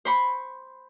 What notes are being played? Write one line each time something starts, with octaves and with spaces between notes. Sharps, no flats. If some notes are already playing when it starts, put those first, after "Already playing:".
C5 B5 C#6